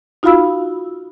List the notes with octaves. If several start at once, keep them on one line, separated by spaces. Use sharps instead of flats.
D#4 F4 F#4 F5 B5 E6